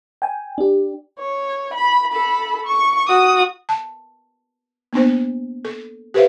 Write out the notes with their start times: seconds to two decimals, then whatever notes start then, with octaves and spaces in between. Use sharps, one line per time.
0.22 G5 G#5
0.58 D4 G4
1.19 C#5
1.74 B5
2.12 A4 B5
2.67 C#6
3.09 F#4 D#6
3.69 A5
4.93 A#3 B3 D4 C5
5.65 A4
6.14 G4 A4 B4 C5 E5 F5